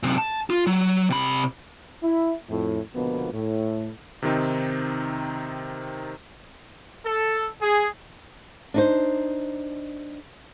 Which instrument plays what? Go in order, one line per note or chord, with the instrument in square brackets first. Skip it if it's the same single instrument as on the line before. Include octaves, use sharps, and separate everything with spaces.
[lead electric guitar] F#2 C3
A5
F4
F#3
C3 B5
[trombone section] E4
F2 A2
C#2 B2 D3 F3 A#3 B3
A2
[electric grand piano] C3 D#3 C4 D#4
[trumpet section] A4
G#4
[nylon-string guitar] D4 D#4 C5